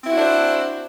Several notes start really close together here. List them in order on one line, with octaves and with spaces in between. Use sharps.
C4 E4 F#4 D4 C5